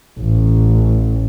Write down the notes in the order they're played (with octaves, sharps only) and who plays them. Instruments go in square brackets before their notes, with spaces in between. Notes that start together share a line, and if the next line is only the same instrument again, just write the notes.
[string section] A1